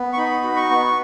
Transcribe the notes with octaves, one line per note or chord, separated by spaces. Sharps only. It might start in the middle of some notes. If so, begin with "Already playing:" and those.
Already playing: B3
C#6
D#4 B5
F#4
C#6
B3